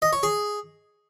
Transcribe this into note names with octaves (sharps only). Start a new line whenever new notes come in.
D#5
C#5
G#4